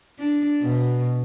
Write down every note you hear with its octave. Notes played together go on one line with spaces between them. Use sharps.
D4
B2